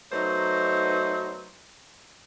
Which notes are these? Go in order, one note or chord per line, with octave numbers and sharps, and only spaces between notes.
F#3 A3 B3 D#4 C5